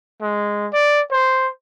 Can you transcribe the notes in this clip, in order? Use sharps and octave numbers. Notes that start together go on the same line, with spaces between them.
G#3
D5
C5